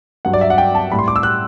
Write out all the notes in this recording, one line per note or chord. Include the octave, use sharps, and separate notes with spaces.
G2 F#3 F#5
D5
E5
F#5
G5
A5
A2 G3 B5
C6
D6
E6
F#6